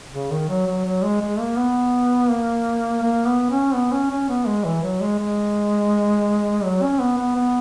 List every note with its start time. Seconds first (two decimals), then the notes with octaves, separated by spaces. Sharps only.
0.12 C#3
0.31 D#3
0.49 F#3
0.67 F#3
0.85 F#3
1.03 G#3
1.21 G#3
1.39 A#3
1.57 B3
2.30 A#3
3.03 A#3
3.26 B3
3.51 C#4
3.74 B3
3.92 C#4
4.10 C#4
4.29 B3
4.47 G#3
4.64 E3
4.83 F#3
5.01 G#3
5.19 G#3
6.64 F#3
6.82 C#4
7.00 B3
7.18 B3
7.36 B3